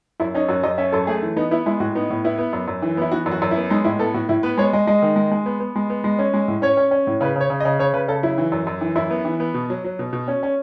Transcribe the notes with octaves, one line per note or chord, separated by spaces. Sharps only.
F#2 E4
C#4 D#4
F#2 F#4
F#2 D#5
C#4 E5
F#2 A4
A3 G#4
E3
B3 D#4
B3 E4
G#3 E4
A2 F#4
B3 D#4
A2
B3 E4
B3
F#2
F#2
E3
B3 E4
E3 F#4
F#2
F#4
F#2
E4
B3
G#3 D#4
A2 E4
B3 A4
A2 F#4
A2 E4
B3 B4
G#3 C#5
G#3 D#5
G#3 D#5
D#3
G#3
G#3
B3
B3
G#3
B3
G#3
C#4
G#3
A2
C#4 C#5
C#4
C#4
A2
C#3 B4
C#3 C#5
C#3
D#5
C#3
C#3 C#5
C#3 B4
C#3 A4
F#3 E4
E3
F#2
F#2
E3
F#2 E4
B3
E3
B3
B2
F#3
F#3
B2
B2
C#4
C#4